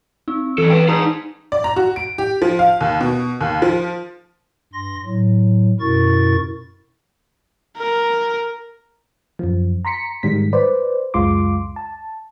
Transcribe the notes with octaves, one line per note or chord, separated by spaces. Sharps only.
C4 D#4
E3 C#4 A4
B4 G5
D#4 G#4 D5 A5 D#6
D5
A#5
F#4
D7
G4
F3
F5
D#2
B2
D#2
F3
G2 C6 A#6
A2 F#3
F#2 B2 E4 A#4 C#6 A6
A#4
F#2 F3
A#5 C6 B6 C#7
G#2 D#3 G3 G#3 B6
B4 C5 D5
C#2 F#2 G#3 F4 C6 D6
A5